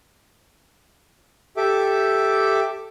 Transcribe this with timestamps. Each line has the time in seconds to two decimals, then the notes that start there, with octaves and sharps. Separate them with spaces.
1.57 G4 A4 E5 D6